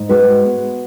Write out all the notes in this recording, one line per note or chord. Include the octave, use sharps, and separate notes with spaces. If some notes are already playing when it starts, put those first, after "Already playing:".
Already playing: G#2
G#3 F#4 B4
B3